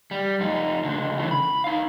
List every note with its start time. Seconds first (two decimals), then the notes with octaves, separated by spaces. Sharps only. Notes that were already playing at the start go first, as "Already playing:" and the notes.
0.11 G3
0.40 F2 D#4
0.84 C#2 D3
1.19 C#3 E3
1.31 B5
1.64 D#4 F5